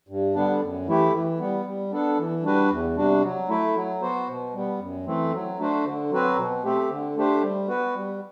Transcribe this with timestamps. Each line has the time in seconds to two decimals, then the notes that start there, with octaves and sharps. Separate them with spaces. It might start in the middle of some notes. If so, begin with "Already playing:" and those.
0.09 G2
0.35 D3 G3 B3 D4
0.61 F#2
0.86 E3 A3 E4 G4
1.13 E3
1.39 G3 B3
1.65 G3
1.91 B3 D4 A4
2.18 E3
2.43 G3 D4 F#4 B4
2.70 E2
2.96 C3 G3 D4 F#4
3.23 F#3
3.48 A3 E4
3.75 F#3
4.02 B3 F#4 C5
4.28 B2
4.54 G3 B3
4.79 F#2
5.05 E3 A3 C4
5.33 F#3
5.58 A3 D4 F#4 C5
5.84 D3
6.11 F#3 C4 F#4 B4
6.37 B2
6.63 A3 C4 G4
6.89 D3
7.16 A3 D4 G4 C5
7.42 G3
7.68 B3 F#4 B4
7.94 G3